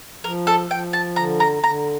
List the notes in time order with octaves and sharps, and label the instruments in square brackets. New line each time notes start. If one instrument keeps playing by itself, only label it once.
[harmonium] F3 [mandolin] A#4
[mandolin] A4
[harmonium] F3 [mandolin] G5
[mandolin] A5
[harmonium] D3 [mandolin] A#5
[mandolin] A#5
[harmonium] D3 [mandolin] A#5